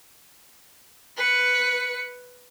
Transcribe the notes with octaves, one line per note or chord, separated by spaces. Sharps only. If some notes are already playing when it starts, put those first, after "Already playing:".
B4 C#7